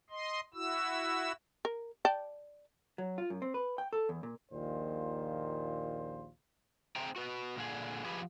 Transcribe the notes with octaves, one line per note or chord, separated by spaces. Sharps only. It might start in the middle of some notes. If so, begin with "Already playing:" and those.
D#5 C6
E4 F#4 E6
A#4
D5 G5 A5
F#3
F4
F#2
C4
B4
G5
A4
E2
A#2
A#1 D#2 A#2 D#3 F4 C5
A3 C4 G#4 C5 G5 A#5
F#4 B4
A#2 D3 G#4
F3 G4 G#4 B4